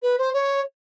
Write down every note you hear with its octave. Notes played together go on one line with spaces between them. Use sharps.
B4
C5
C#5